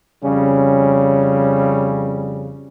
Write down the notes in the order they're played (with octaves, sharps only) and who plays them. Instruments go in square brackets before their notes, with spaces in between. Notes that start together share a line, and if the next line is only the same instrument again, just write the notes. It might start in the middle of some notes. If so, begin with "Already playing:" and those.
[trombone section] F2 C#3 G3 C#4